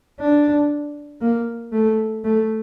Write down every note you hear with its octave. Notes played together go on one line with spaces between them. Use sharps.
D4
A#3
A3
A3